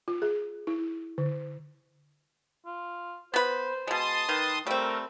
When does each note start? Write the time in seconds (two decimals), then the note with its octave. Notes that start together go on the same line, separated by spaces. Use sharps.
0.08 F4
0.22 G#4
0.67 E4
1.18 D3
2.66 F4
3.34 B3 B4 C5
3.87 B2 G#3 A5 C6 D#6
4.29 D#3 B4
4.67 G3 A3 C4 A#4